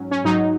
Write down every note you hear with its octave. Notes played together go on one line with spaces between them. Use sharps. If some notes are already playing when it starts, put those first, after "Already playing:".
Already playing: G#2 F#3 C#4
C#4
G#2 F#3 D#4